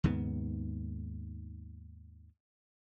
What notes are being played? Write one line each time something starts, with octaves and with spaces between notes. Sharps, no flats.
D#2 G#2 C#3 B3